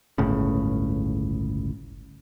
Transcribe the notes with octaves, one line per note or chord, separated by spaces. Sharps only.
G1 C#2 A2 C#3